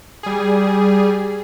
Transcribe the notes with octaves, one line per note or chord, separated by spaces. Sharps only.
G3 G#4